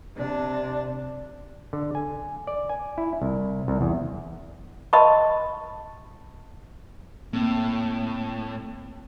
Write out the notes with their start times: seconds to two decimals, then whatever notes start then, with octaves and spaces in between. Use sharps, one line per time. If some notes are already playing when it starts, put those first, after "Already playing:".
0.15 C3 D4
1.73 D3
1.95 G#5
2.47 D5
2.69 G#5
2.98 E4
3.22 C2
3.68 C2
3.81 E2
4.93 D#5 A5 B5 C#6
7.33 A2 A#3 C4